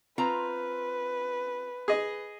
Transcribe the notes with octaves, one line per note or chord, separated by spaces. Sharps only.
C4 F4 B4 A#5
G#4 D#5